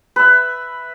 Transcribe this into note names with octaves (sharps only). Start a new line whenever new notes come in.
B4 E5